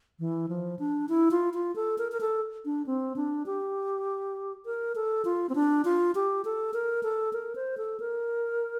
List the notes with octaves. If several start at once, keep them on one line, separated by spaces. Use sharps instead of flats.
E3
F3
D4
E4
F4
F4
A4
A#4
A#4
A4
D4
C4
D4
G4
A#4
A4
F4
C4
D4
F4
G4
A4
A#4
A4
A#4
C5
A4
A#4